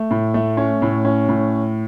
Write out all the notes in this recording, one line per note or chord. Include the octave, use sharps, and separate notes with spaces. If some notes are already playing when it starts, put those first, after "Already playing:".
Already playing: A3
A2
A3
C#4
A2
C#4
A2